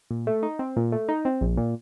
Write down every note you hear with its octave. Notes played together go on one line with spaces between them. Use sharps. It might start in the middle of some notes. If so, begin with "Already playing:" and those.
A#2
A3
D#4
C4
A#2
A3
D#4
C4
A#1
A#2